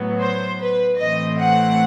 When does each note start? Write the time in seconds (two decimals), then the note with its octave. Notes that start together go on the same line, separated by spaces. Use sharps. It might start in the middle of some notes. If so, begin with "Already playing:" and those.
Already playing: A2 F#3 B3
0.20 C5
0.60 B4
0.99 A2 E3 A3 C4 D#5
1.38 F#5